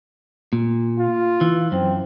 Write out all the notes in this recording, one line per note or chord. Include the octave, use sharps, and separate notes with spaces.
A#2
F4
E3
F#2 C4